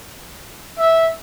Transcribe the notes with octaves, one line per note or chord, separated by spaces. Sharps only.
E5